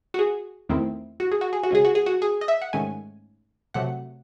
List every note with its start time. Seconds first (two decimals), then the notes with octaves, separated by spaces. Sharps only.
0.14 F#4
0.19 G#4
0.69 E2 D#3 A3 C4 E4
1.20 F#4
1.32 G#4
1.41 F#4
1.53 G#4
1.63 F#4
1.71 C#3 G#3 C#4 G#4
1.85 F#4
1.95 G#4
2.06 F#4
2.22 G#4
2.41 D#5
2.48 E5
2.62 F#5
2.73 G#2 D#3 A3 C#4 G#5
3.74 C3 F#3 A3 F#5